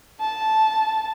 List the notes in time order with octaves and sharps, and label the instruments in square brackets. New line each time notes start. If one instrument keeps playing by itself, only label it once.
[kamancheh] A5